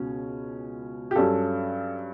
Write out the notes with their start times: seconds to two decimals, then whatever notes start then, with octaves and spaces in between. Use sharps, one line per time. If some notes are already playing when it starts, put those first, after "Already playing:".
Already playing: C#2 B2 C#4
1.11 G4
1.15 G2 F#3 C#4 A4